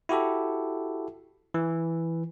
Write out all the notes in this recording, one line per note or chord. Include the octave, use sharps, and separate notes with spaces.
E4 F#4 G4 A4
E3